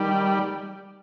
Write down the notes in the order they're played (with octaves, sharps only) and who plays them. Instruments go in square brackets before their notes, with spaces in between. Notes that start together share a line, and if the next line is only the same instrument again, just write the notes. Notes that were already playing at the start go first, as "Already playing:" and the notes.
Already playing: [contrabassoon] D#3 [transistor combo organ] G3